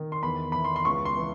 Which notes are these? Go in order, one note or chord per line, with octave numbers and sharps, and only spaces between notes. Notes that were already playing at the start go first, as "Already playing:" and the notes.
Already playing: D#3
C6
E2 B5
E3 B5
C6
C6
C#2 C#6
C6
E3